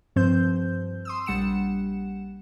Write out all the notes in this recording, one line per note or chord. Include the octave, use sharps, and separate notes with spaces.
G2 F3 C4 C5 G6
C6 D#6 E6
A#1 G3 F#5 C#7 E7